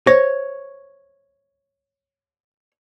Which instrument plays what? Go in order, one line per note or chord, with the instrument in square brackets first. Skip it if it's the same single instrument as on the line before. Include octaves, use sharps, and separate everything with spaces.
[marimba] C5 [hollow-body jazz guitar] C#5